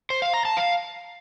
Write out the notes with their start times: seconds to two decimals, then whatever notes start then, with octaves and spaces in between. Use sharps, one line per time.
0.10 C5
0.22 F5
0.34 A#5
0.45 A5
0.57 F5